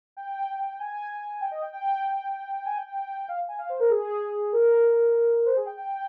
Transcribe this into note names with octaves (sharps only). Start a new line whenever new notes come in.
G5
G#5
G5
D#5
G5
G5
G#5
G5
G5
F5
G#5
F5
C5
A#4
G#4
A#4
C5
G#4
G5
G5